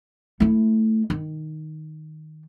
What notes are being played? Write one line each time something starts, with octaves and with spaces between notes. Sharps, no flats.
A3 E4
D#3